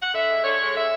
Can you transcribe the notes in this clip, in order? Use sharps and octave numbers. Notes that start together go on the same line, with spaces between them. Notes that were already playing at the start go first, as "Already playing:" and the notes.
F#5
D3 E5
G#3
D3 C#5
G#3
D3 E5